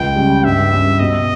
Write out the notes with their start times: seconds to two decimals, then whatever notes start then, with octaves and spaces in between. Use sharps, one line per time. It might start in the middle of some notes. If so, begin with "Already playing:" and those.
Already playing: C#2 G5
0.16 C#3 G3
0.44 G2 E5
0.72 G3 C#4
1.00 B2 D#5